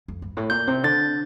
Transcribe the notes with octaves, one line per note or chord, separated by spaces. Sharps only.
F2
G2
A2
A#2 G6
C3
D3 A6